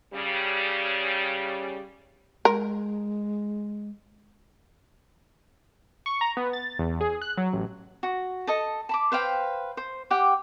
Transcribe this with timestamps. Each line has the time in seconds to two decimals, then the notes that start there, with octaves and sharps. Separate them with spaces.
0.13 C#3 G3
2.45 G#3 A#4
6.06 C#6
6.21 A#5
6.37 B3
6.53 A6
6.79 E2
7.01 G#4
7.22 F#6
7.37 F#3
7.53 A1
8.03 F#4
8.47 A4 D#5 A5
8.89 A5 B5 D6
9.12 B4 C5 F5 G5
9.77 C5
10.10 G4 F#5 G5 D6